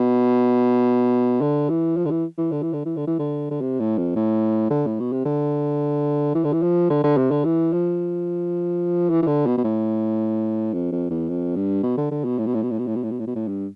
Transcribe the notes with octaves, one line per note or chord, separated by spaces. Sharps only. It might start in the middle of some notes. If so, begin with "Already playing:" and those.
Already playing: B2
D3
E3
F3
D3
E3
E3
D3
E3
D3
E3
D3
E3
D3
D3
C3
A2
F2
A2
D3
A2
B2
C3
D3
E3
D3
E3
F3
D3
D3
C3
D3
E3
F3
E3
E3
D3
B2
B2
A2
F2
F2
E2
F2
G2
B2
D3
D3
B2
A2
B2
A2
B2
A2
B2
A2
B2
A2
B2
A2
B2
A2
G2